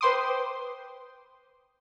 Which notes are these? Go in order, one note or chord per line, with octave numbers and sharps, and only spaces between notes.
B4 C5 G5 C6 D6 D#6